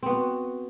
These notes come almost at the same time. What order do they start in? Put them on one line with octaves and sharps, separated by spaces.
C4 B3 F#4